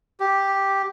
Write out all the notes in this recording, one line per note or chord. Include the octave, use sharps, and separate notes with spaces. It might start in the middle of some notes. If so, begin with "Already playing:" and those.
G4